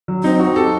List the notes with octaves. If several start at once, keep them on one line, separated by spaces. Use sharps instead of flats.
F#3
C4 D#4
F#4
G4 A4